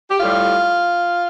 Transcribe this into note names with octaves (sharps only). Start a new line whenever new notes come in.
G4
A2 G3 F4